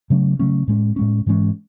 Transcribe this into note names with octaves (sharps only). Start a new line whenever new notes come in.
C#3 F#3 A3 C#4
C#3 F#3 A3 C#4
A2 G#3 C#4
A2 G#3 C#4
G#2 E3 G#3 C#4